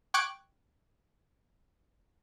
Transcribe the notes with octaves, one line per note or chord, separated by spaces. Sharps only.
G5 C#6 D6 F#6 G#6 D7